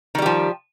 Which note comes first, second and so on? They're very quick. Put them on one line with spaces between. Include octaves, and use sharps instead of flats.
D#3 G3 G4 F3